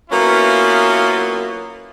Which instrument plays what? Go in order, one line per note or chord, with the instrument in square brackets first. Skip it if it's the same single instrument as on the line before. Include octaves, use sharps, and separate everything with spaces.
[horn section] F#3 A#3 B3 C#4 E4 F4